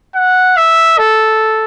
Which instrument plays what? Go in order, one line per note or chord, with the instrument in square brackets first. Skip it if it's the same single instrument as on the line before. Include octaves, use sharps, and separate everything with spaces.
[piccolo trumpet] F#5
E5
A4